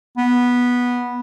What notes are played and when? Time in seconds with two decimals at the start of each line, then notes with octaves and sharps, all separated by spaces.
0.18 B3